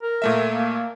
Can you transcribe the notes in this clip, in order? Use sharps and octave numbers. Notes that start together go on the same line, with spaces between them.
A#4
A#2 A3 E5
A#3